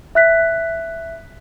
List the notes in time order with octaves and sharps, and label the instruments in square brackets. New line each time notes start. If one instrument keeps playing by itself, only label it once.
[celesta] E5 F#6 B6